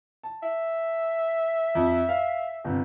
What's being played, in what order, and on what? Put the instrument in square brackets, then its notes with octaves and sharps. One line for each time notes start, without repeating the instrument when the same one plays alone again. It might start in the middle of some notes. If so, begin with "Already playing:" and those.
[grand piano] A5
[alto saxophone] E5
[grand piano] F2
F5
G1 C3